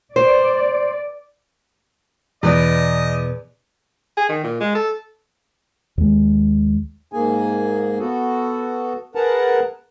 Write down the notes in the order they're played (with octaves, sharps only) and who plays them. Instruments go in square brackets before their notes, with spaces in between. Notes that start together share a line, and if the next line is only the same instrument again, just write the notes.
[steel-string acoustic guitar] C5 [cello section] D5
[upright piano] E2 [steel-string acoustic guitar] B2 B4 D5 [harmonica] D#5
[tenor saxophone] G#4
D#3
A#2
G#3
A4
[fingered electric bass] D#2 G#3
[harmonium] G#2 A#3 G#4 G#5
B3 F#4 A4
G#4 A#4 B4 F#5 A5 A#5